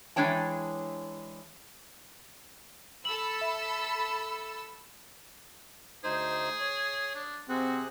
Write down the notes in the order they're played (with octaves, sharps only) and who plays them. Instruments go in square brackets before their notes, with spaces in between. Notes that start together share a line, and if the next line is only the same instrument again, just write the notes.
[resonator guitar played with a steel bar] E3 G#3 D4 C#5 G5 A5
[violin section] A4 E6 [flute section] B5 [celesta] F#7
[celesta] E5
[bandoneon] D2 D#4 C5 [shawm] G#4
[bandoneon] C#5
[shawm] D4
[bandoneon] C3 G#4 F#6 [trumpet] C4 [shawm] F#4